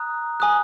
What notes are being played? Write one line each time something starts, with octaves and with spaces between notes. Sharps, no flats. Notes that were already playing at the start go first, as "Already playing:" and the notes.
Already playing: A#5 D#6 F#6
G#5 D#6 F#6